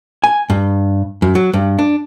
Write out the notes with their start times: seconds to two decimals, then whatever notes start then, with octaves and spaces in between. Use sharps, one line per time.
0.24 G#5
0.50 G2
1.22 F#2
1.35 F#3
1.53 G2
1.79 D4